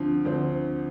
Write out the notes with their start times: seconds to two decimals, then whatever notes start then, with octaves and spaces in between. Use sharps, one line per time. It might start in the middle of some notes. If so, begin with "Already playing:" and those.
Already playing: D2 D3 F3 C4
0.25 D2 D3 F3 C4